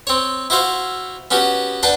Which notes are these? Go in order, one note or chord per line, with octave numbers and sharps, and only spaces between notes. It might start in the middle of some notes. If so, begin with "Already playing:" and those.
C4 C#5
E4 F#4 C5 F5
B3 C#4 F#4 G4
D4 B4 F#5 G5 A5